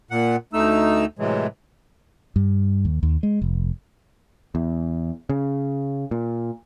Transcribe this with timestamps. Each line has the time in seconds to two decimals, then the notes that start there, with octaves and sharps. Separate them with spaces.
0.11 A#2 F#5
0.53 D2 A3 D#4 E6
1.19 A2 C3 E3 F#3 G#3
2.36 G2
2.85 D#2
3.03 D#2
3.23 G#3
3.42 F1
4.55 E2
5.30 C#3
6.11 A#2